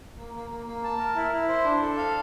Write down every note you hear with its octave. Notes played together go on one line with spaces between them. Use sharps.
A#3
A#3
A#3
A#3
A5
A#4
E4
E4
C5
D4
A4
F5